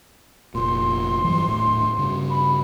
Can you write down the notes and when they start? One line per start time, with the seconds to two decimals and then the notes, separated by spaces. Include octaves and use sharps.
0.55 F1 A#2 C6
1.24 G2 E3 F#3
1.48 D#1 A2
1.97 G2 C#3
2.30 B5